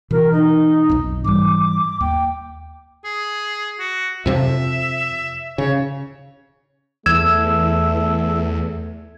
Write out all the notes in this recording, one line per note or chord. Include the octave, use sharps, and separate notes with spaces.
B2 E3 A#4
D#4
B1 F2
G#2 E3 G3 D6
D#2 G5
G#4
F#4
F2 C3 F3 E5
C#3 C#5
E2 A3 E6 G#6